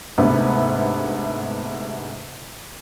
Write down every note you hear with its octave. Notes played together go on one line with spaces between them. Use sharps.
D2 G#2 C3 A3 B3